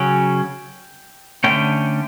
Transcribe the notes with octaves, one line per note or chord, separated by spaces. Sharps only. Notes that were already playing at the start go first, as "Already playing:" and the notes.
Already playing: C#3 F#3 C#4 G5
D3 A3 C#4 G5